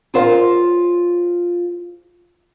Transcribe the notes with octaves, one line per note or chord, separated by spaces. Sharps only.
F4 G#4 A#4 C5 C#5 F5